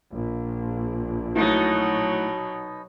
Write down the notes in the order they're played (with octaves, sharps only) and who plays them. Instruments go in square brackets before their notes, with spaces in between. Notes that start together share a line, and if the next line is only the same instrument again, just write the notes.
[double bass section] A#1
[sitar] B2 D#4 [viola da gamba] F#3 [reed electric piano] A3 E4